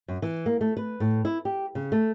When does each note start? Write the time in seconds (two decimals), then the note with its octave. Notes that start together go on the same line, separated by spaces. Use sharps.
0.08 F#2
0.22 E3
0.46 A#3
0.61 A3
0.77 B4
1.00 A2
1.25 E4
1.45 G4
1.75 C#3
1.92 A3